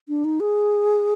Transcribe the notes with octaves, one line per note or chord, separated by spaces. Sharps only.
D4
D#4
G#4